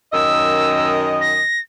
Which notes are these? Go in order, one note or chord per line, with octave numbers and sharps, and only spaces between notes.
F#2 D#3 D#5 E6
A#6